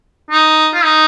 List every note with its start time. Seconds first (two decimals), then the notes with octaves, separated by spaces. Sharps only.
0.31 D#4
0.74 F4
0.84 D#4